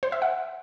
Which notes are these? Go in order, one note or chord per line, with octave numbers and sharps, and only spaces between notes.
C5
E5
F#5